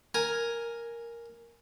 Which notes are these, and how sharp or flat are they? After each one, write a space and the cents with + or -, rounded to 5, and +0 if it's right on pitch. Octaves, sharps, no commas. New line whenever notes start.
A#4 +0 G#5 +0